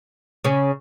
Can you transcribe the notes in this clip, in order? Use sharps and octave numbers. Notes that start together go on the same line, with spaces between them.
C#3 C#4